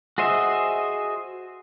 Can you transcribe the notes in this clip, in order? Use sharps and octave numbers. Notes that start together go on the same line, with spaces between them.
F#4 G#4 C5 D#5 E5